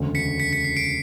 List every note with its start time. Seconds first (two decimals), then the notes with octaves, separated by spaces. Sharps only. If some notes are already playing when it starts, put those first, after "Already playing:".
Already playing: E1 D2 C#3
0.15 B6 C#7
0.40 B6 C#7
0.53 B6 C#7
0.64 C7
0.77 C7 D7